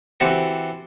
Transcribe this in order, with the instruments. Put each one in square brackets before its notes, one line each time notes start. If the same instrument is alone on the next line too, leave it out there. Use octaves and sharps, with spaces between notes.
[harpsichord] E3 C4 F#4 G4 A4